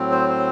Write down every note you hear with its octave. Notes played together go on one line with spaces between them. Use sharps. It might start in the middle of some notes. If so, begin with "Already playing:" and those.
Already playing: A2 F#3 C4
C5
C5